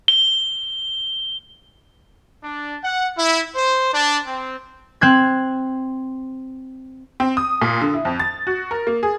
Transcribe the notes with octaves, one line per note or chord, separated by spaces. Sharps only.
G7
D4
F#5
E4
C5
D4
C4
C4 F#6 G#6
C4
D#6
A#2
D3
E4
F2
A6
F#4
A#4
A#3
G#4